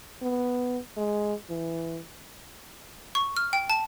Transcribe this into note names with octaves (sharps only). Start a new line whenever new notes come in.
B3
G#3
E3
C#6
F6
G5
A5